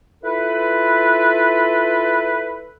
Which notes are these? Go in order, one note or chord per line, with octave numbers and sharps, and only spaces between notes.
E4 F4 A4 B4